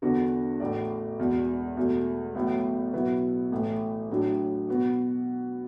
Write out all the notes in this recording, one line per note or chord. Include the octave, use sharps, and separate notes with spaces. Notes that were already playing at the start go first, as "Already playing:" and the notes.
E2 D3 B3 D4 F#4
A1 A2 A3 F#4 D5
E1 E2 B2
E2 B2 A3
A1 A2 F#3 B3
B1 B2 B3 E4 B4
A1 A2 E3 A3
A1 A2 F#3 D4
B2 B3 F#4